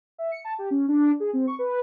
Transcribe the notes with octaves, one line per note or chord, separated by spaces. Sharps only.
E5
C#7
A5
G4
C#4
D4
G#4
C4
C#6
B4